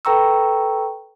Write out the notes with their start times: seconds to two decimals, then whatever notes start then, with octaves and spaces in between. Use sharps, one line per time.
0.05 A4 B4 G5 A#5 C#6 E6